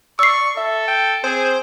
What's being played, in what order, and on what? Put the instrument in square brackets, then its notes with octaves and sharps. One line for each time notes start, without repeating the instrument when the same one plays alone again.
[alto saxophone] D5 [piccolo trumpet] C#6 [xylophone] E6 C7
[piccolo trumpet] A4 [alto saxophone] E5
[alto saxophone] G5
[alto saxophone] C4 [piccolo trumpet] G#4 [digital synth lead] C5